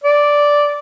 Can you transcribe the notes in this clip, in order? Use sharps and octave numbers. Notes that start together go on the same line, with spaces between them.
D5